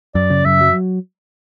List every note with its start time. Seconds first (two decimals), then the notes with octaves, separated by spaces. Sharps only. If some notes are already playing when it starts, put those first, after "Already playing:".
0.15 F#2 D5
0.30 C#3
0.45 F#2 E5
0.61 F#3